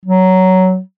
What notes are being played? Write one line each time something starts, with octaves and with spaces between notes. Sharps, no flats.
F#3